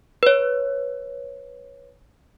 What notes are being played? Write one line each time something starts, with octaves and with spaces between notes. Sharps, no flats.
B4 C#5